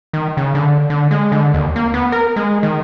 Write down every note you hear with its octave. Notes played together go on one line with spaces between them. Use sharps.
D#3
C#3
D3
D3
G#3
D3
D#2
A#3
B3
A#4
G#3
D#3